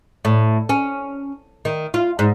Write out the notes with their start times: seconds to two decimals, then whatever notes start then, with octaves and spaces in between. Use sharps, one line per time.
0.25 A2
0.69 C#4
1.65 D#3
1.94 F4
2.19 G#2